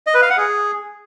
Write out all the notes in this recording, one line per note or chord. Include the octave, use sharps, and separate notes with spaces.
D#5
B4
F5
F#5
G#4